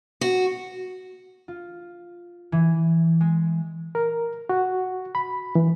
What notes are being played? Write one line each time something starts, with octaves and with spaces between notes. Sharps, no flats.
F#4
F4
E3
G#3
A#4
F#4
B5
E3